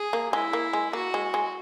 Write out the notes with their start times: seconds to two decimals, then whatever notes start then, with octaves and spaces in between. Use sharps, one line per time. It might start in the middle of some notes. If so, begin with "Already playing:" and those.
Already playing: G#4
0.13 A#3
0.33 G#3 E4
0.53 A#3
0.73 G#3
0.93 A#3 F#4
1.14 G#3
1.34 G#3